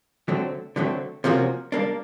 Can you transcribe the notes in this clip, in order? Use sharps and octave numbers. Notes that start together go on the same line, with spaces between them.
D3 F#3 A3 C4
D3 F#3 A3 C4
C3 F3 A#3 C#4 F#4
G3 A#3 D4